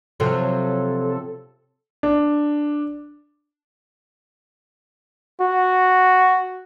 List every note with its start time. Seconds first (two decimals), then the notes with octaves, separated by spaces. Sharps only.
0.20 C3 F3 F#3 A4
2.03 D4
5.41 F#4